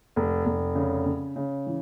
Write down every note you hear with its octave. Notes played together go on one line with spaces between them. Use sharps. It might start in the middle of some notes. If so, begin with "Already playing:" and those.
F1
F1
C#3
C#3
C#3
E3